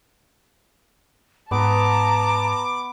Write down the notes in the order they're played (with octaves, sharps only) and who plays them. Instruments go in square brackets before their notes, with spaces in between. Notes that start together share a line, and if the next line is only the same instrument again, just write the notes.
[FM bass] G#2 [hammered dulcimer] B3 [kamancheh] A5 A#5 [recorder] D6